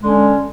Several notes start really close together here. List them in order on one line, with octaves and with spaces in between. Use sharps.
G#3 D3 C#4